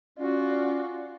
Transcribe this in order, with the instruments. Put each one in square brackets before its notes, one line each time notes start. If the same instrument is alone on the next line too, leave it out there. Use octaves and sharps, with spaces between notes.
[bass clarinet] C#4 [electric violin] F4 F#4 [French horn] D5